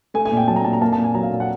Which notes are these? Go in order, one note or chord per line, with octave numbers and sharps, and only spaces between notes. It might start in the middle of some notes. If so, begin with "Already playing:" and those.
A3 G#5
G#5
A#2
G5
F#3 A5
A#5
A#2 A5
A#5
A#3 A5
A5
A#2
G#5
F#3 A#5
F5
A#2
F#5